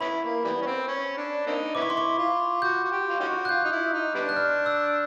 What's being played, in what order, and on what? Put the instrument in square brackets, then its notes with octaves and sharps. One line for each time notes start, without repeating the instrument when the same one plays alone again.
[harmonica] B3 C#4 E4 [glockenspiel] B5
[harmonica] A#3
E3 G3 B3
C#4
C4
C#4
D4
A#3 C4 D#4
[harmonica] B3 C#4 E4 [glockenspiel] D6
[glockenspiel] C#6
C6
C#6
[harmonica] F4
[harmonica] F#4 [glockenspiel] G6
[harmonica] F#4
G4
F4
C#4 D#4 F#4
[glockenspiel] F#6
[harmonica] F4 [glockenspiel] G6
[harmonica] D#4
E4
D#4
G3 B3 D4
[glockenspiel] F#6
F6
E6